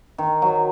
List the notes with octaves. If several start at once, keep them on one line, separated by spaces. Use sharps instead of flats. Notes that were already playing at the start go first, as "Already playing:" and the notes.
D#3
F#3